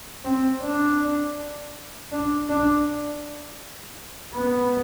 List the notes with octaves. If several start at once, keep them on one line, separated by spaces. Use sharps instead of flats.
C4
D4
D4
D4
B3